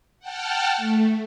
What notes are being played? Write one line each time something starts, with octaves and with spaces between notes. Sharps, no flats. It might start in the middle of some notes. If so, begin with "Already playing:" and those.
F#5 G5 A5 F6
A3